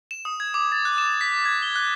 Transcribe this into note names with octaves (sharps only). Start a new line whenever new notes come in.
E7
D#6
G#6
D6
A6
F#6
E7
B6
G#6
G7
F#6